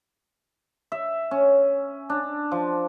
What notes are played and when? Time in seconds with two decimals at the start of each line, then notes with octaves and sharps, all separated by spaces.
0.92 E5
1.31 C#4
2.10 D4
2.51 F3